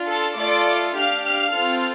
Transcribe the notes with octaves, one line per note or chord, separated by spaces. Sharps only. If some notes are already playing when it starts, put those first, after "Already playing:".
Already playing: D4 F4
A4 A5
A3 F4 A4 D5 D6
D4 G4 F5 F6
F5 F6
C4 F4 A4